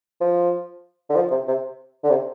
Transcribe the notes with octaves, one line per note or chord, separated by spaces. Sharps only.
F3
D3
F3
C3
C3
D3
C3